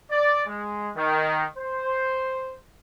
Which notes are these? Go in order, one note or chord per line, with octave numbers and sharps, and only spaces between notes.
D5
G#3
D#3
C5